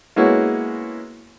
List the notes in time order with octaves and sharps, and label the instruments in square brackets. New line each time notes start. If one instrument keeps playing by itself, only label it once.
[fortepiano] G#3 A#3 B3 C#4 E4 F#4